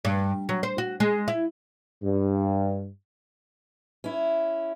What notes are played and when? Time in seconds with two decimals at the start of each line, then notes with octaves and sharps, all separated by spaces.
0.05 G2
0.49 F#3
0.63 C5
0.78 F#4
1.00 G#3
1.28 E4
2.04 G2
4.04 C#4 E4